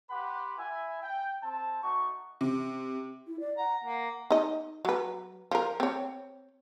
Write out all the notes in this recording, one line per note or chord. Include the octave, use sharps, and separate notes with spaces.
G4 B4 F#5 B5 C6 D6
E4 E5 G#5
G5
C4 A5
A3 D#4 F#4 C#6
C3
E4
D5
F#5 A#5
A#3 F#5
D#4 D#5
F#3 B4
F3 A#4
C4 C#5